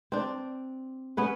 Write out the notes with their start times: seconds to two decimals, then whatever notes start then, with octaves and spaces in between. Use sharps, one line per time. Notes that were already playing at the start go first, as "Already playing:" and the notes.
0.12 C4 D4
1.17 B3 C#4 B4